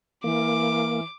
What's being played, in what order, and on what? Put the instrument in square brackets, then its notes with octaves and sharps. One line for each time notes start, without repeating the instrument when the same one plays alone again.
[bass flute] E3 [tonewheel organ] A#3 [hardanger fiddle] D6